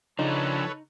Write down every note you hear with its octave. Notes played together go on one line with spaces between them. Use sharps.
C#3 F3 D4 D#4 A4 B4 C#5